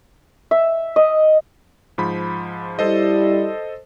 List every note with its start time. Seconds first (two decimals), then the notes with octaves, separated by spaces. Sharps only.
0.51 E5
0.96 D#5
1.98 G#2 F3 B5
2.79 G3 E4 A4 C5 D#5